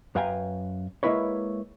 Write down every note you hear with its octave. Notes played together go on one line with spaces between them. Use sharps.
F#2 B4 F5 G5 G#5 A#5
G#3 A#3 E4 B4 C#5